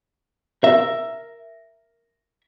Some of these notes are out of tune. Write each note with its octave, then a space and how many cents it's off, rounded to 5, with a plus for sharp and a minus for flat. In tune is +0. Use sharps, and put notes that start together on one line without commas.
A#4 +0 E5 +5